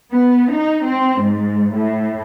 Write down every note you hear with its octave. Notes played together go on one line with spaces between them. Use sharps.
B3
D#4
C4
G#2
A2